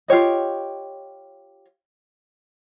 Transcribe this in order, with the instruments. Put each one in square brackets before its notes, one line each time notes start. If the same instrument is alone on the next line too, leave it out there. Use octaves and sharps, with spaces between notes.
[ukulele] F4 G4 C#5 D#5